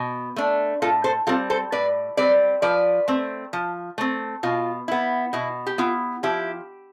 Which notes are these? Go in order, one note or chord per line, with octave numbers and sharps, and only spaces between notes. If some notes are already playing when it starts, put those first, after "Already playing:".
Already playing: B2
A3 D4
A2 F4 A4
A4 C5
G3 C4 F4 A4
A4 C5
A2 B4 D5
G3 C4 B4 D5
F3 B4 D5
A3 C4
F3
A3 C4
B2 F4
B3 E4
B2 E4
G4
B3 E4 F4
F3 E4 G4